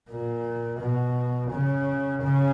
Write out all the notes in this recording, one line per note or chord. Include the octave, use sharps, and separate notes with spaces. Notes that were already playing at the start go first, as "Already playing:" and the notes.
A#2
B2
C#3
C#3